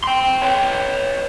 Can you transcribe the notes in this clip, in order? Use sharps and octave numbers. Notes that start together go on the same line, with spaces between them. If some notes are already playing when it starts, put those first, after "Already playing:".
G5 C6
B4 C#5